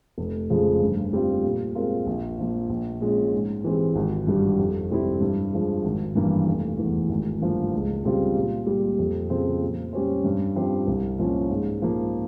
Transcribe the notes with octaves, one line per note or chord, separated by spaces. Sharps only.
F1
F2 C#3 F3 G#3
G2
G3 C4 F4
A#2
G#3 C4 F4 A#4
A#1
A#2 F3 A#3 F4
A#1
A#2 G#3 C#4
G#2
E3 G#3 C4 G4
G#1
G2 G3
F2
C3 G3 C4 E4
G2
F3 G#3
G#1
G2 E3 A#3 E4
F1
E2 E3
G#1
G2 F3 A#3
C#2
C#3 G3 C4 F4
A#2
G3 A#3
F2
C#3 F3 C4
A#2
G3 C#4 G4 C5
G2
F3 C4 G4 C5
C2
A#2 F3 A#3 C#4
G#2
F3 A#3